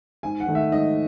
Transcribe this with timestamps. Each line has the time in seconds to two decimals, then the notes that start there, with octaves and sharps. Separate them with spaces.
0.23 G#2 G#5
0.40 F#5
0.47 D#3 A3 D#4
0.55 E5
0.71 G#2 D#5